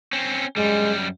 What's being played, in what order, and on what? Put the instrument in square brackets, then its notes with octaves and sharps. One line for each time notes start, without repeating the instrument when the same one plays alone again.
[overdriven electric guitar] C4 C#4
[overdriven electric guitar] F#2 G3 [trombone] G#3